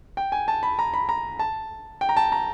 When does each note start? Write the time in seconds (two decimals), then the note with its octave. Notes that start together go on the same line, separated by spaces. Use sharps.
0.17 G5
0.32 G#5
0.48 A5
0.63 B5
0.79 A#5
0.94 B5
1.09 A#5
1.39 A5
2.01 G5
2.09 A#5
2.17 A5
2.32 A#5